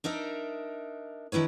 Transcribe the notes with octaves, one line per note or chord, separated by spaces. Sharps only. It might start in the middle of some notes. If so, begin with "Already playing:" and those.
D4 D#4 A#4 E5
D#3 D4 E4 B4 C#5